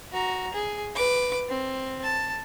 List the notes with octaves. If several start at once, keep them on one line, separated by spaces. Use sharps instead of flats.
F#4 A#5
G#4
B4 D6
C4
A5